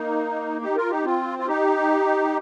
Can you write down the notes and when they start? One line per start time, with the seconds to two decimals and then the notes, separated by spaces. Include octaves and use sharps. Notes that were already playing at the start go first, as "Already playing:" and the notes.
Already playing: A#3 D#4
0.61 D#4 G4
0.76 F4 A#4
0.90 D#4 G4
1.04 C4 F4
1.39 F4
1.47 D#4 G4